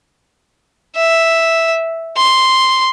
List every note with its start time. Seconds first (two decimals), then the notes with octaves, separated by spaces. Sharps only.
0.96 E5
2.17 C6